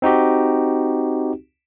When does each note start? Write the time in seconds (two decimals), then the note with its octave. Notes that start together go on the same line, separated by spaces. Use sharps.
0.02 C4 D#4 F#4 G4